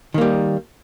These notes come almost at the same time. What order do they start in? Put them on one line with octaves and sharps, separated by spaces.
D#3 A#3 G3